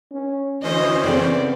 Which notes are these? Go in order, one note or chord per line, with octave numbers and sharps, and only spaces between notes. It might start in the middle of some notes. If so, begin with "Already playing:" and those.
C#4
D2 E3 C#4 C5 D#5
C#3 B3 C4 A4 D5